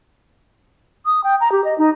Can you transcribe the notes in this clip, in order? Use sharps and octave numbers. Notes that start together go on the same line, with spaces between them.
D#6
G5
A#5
G4
D#5
D#4